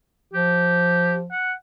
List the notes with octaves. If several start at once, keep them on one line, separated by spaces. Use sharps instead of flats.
F3 G4
F#5